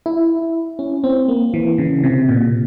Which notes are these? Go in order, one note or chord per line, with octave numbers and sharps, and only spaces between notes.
E4
C#4
C4
A#3
E3
C#3
C3
A#2